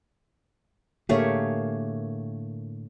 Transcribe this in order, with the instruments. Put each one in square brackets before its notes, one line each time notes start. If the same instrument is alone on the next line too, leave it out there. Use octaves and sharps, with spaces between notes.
[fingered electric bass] A2 D3 [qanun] A3 G4 G#4 [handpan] A#3 C#5 F5